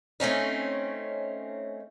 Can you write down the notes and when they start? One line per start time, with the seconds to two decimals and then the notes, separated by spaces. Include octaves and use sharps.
0.20 A3 C4 C#4 D#4